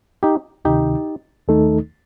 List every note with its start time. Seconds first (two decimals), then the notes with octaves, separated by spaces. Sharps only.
0.23 D#4 G4
0.65 D2 C3 D#3 D#4 G4
1.48 D#2 D#3 A3 D#4 A4